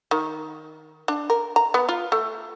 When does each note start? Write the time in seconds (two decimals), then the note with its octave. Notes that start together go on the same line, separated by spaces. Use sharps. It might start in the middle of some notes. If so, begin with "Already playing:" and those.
0.11 D#3
1.08 D4
1.30 A#4
1.56 A#5
1.74 B3
1.89 F4
2.12 A3